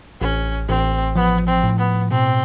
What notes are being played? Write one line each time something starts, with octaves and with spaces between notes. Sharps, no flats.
A1 C#4
A1 C4
F3 B3
C4
A2
B3
B2 C4